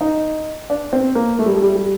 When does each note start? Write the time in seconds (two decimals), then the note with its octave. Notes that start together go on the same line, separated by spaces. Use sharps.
0.01 D#4
0.70 D4
0.93 C4
1.15 A#3
1.39 A3
1.46 G3
1.54 A3
1.62 G3
1.76 G3